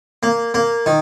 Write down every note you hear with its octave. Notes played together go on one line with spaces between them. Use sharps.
A#3
A#3
D#3